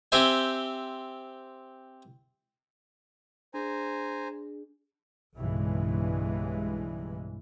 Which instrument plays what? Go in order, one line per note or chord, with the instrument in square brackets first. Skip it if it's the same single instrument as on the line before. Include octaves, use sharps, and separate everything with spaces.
[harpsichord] C4 G4 C5 E5 G#5
[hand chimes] D4 G#4 [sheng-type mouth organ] C5 G#5 A#5
[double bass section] B1 G2 C#3 E3 G#3